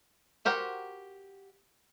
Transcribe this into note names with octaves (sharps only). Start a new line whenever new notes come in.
F#4 G4 A#4 C5 F#5